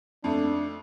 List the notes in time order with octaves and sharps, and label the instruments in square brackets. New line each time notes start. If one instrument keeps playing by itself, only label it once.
[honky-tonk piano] F2 A3 [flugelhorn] D4